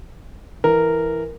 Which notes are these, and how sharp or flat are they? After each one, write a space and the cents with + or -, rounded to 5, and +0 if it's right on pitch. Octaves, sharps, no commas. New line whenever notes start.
E3 +0 A#4 -10